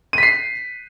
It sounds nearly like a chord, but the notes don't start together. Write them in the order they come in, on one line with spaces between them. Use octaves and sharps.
D#7 B6 C7